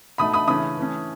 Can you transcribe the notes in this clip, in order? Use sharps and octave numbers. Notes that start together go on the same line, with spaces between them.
B2 A3 D#4 B5 D#6
B5 D#6
C#3 E3 A3 C#4 B5 D#6
E3 A3 C#4